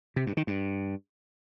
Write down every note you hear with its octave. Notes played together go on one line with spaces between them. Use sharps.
C3
G2
D#3
G2